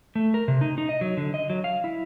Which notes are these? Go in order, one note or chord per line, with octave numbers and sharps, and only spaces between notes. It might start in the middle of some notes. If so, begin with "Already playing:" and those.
A3
A#4
C3
D#4
D#4
D#5
F#3
D3
D#5
F#3
F5
E4